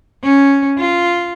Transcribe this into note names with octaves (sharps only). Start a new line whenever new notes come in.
C#4
F4